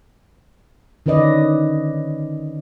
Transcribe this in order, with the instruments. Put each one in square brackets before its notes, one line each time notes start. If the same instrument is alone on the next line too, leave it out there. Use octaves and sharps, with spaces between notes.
[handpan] D3 D#3 C#4 B4 D5 D#5